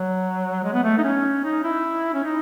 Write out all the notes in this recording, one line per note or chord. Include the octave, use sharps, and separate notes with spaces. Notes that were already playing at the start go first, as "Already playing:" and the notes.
Already playing: F#3
G#3
B3
A3
D#4
C#4
D#4
E4
C#4
D#4